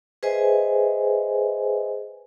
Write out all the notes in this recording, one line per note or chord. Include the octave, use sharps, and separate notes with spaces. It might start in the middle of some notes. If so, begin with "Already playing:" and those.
G#4 B4 C5 D#5 E5 G#5